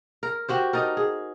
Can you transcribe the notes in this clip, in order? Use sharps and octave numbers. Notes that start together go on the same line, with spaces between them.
A#4
F#4 G4 C5
D#4 A4 A#4
G#4